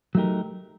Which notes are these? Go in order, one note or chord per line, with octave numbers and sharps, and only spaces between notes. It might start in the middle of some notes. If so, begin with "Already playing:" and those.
F#3 A3 D#4 G4 A#4